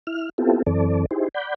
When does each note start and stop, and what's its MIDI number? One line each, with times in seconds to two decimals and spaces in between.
0.07 0.29 64
0.07 0.29 89
0.38 0.62 59
0.38 0.62 60
0.38 0.62 64
0.38 0.62 65
0.38 0.62 67
0.38 0.62 69
0.67 1.06 42
0.67 1.06 52
0.67 1.06 60
0.67 1.06 69
0.67 1.06 74
1.11 1.28 63
1.11 1.28 64
1.11 1.28 67
1.11 1.28 68
1.11 1.28 72
1.34 1.54 74
1.34 1.54 78
1.34 1.54 83
1.34 1.54 91